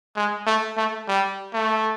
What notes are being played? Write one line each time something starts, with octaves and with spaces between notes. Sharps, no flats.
G#3
A3
A3
G3
A3